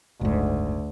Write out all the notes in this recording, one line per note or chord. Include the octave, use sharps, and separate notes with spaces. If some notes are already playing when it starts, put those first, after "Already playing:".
F#1 D2 G#2